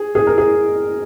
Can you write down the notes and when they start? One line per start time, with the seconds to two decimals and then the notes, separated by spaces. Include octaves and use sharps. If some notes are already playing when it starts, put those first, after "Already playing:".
Already playing: G#4
0.15 G#4
0.27 A#4
0.38 G#4